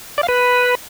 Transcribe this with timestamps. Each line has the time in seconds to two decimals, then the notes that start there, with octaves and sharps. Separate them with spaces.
0.18 D5
0.23 F5
0.28 B4